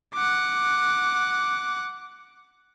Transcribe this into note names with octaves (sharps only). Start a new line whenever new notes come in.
F#5 D6